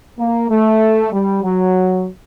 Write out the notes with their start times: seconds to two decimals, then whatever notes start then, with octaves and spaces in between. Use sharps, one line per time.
0.19 A#3
0.50 A3
1.13 G3
1.43 F#3